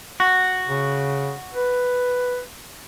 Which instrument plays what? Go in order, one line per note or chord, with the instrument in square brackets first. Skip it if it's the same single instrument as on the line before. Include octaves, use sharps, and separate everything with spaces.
[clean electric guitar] F#4
[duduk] C#3
B4